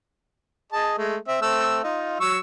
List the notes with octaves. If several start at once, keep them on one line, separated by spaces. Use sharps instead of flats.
G#4 D#5 A5
G#3 A3
C4 E5
A3 C4 E6
D#4 F4
F#3 C#6 E6